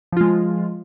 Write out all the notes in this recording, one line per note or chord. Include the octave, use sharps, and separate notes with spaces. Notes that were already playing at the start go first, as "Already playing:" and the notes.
F3 G#3 F4